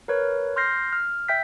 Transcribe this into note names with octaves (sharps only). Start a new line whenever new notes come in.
A#4 B4 C#5
C6 F6 G6 A#6 C7
F6
E5 G5 G6 B6